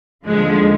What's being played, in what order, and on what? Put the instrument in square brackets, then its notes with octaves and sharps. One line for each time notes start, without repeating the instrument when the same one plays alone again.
[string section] D#2 D3 F3 G#3